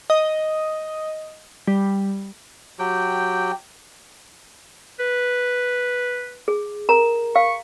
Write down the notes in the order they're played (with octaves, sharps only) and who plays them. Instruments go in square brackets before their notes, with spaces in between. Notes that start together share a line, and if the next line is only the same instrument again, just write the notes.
[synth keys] D#5
G3
[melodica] F#3 G4 G5
[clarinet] B4
[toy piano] G#4
[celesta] A#4 [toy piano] A#5
[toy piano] F5 [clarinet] C#6